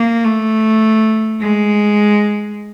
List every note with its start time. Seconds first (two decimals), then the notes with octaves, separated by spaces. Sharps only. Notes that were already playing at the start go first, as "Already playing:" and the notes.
Already playing: A#3
0.24 A3
1.40 G#3